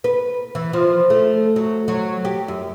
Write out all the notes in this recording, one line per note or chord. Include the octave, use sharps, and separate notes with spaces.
B4
E3
F3
A3
F#3
F#3
G4
F#2